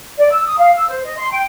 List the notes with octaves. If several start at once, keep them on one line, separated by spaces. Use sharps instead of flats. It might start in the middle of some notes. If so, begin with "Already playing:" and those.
D5
E6
D#6
F5
E6
C5
D#5
C6
G5